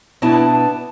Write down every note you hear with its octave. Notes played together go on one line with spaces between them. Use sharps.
B2 B3 D4 E4 A5